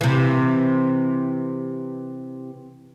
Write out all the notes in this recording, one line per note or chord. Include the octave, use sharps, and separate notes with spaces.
C3 E3